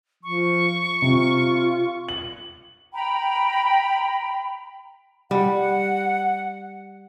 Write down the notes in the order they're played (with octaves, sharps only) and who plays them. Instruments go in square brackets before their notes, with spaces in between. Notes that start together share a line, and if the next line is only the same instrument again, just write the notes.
[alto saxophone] F3 [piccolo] C#6
[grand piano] C3 [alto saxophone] F4
[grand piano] F#7
[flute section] G5 A#5 B5
[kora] G3 [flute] F#5